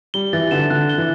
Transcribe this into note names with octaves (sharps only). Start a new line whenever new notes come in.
G3 G7
E3 A6
D3 E7
D3 F#6
G7
E3